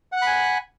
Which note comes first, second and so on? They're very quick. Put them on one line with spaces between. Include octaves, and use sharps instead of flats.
F#5 F#6 B5 G#5